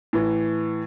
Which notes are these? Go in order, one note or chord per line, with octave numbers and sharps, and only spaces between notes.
A2 E3